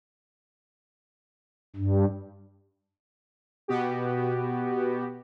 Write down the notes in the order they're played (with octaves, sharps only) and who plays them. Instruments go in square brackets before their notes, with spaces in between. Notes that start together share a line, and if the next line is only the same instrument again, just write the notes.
[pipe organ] G2
[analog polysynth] B2 B3 F#4 G4